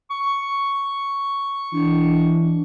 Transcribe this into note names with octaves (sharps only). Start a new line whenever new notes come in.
C#6
E3 D4